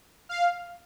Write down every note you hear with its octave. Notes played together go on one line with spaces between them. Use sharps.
F5